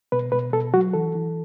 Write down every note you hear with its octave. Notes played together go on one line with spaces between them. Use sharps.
B2 B4
B2 B4
B2 A4
F#3 F#4
E3 A4
E3